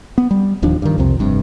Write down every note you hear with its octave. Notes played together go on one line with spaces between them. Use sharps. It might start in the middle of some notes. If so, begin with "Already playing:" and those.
B3
G3
D1 D#2 F3 D4
G2 D#3
C2 F2 C3
F1 G2 C3